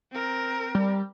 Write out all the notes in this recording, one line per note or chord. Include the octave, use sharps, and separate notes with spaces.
C4 A#4
G3